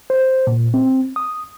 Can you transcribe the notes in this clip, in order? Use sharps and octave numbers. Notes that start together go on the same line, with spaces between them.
C5
A#2
C4
D#6